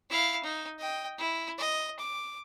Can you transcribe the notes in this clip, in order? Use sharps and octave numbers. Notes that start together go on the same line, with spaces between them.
E4 F5
D#4
D#5 G5
E4
D#5
D6